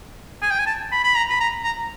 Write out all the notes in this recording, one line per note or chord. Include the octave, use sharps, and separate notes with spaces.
G#5
G5
G#5
A5
B5
B5
A#5
B5
A#5
A#5